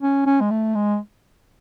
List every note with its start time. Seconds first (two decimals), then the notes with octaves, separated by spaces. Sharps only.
0.01 C#4
0.26 C#4
0.41 G#3
0.50 A3
0.75 G#3